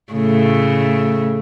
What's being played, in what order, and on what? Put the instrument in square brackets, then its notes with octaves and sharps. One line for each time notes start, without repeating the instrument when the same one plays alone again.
[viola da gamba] A2 C#3 A3